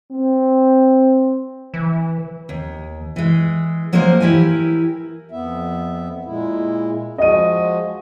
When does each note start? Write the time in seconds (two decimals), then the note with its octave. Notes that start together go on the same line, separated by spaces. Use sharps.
0.11 C4
1.74 E3
2.49 D#2
3.16 E3 G#3
3.93 F#3 G#3 A#3 D4 A#4 C5
4.20 E3 E4 G4 A#4 G#5
5.31 F2 B3 E5
6.25 A#2 G#3 E4
7.18 F3 G#3 F#4 D#5 D#7